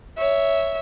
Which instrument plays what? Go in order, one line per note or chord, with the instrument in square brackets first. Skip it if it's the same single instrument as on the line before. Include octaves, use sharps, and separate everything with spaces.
[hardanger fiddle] C#5 [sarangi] E5